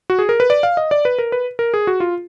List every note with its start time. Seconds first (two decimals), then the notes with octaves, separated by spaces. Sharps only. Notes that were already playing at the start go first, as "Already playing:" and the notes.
0.10 F#4
0.19 G#4
0.29 A#4
0.40 B4
0.50 D5
0.63 F5
0.77 D#5
0.91 D5
1.05 B4
1.19 A#4
1.32 B4
1.59 A#4
1.74 G#4
1.87 F#4
2.00 F4